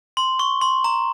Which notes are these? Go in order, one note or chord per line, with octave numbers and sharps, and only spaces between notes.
C6
C#6
C6
A#5